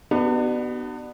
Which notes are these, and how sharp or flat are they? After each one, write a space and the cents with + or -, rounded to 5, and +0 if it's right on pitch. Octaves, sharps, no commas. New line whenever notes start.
B3 +0 D4 +40 F#4 +40